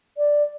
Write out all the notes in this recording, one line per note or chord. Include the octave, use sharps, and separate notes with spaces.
D5